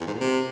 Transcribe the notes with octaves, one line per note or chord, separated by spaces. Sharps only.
E2
G#2
A#2
C3